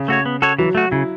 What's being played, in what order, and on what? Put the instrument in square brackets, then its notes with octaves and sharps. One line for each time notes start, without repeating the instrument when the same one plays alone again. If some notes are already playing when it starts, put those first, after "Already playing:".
Already playing: [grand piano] C#3
[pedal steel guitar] A3 F#4 C#5
B3
F#4 A4 C#5
[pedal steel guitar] E3 [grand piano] F#3
[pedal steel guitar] A3 F#4
[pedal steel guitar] C#3 [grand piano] E4